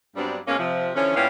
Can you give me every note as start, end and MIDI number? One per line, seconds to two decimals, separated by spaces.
0.16 0.38 43
0.16 0.38 54
0.16 0.38 55
0.16 0.38 59
0.16 0.38 60
0.16 0.38 62
0.47 0.58 47
0.47 0.58 56
0.47 0.58 58
0.47 0.58 61
0.58 0.90 48
0.58 0.90 53
0.95 1.13 50
0.95 1.13 52
0.95 1.13 53
0.95 1.13 61
1.15 1.26 46
1.15 1.26 55
1.15 1.26 59
1.15 1.26 61
1.15 1.26 64
1.15 1.26 77